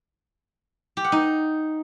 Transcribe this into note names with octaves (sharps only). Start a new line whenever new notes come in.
G4
F#5
D#4